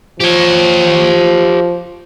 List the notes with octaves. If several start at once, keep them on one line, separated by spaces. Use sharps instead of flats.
F3 G4 C#5